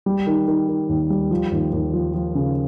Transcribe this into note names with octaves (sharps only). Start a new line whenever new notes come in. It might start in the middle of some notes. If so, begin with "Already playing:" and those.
G3
D#3
D#3
D#3
D#2
G3
F3
D#2
D#2
F3
F3
C#3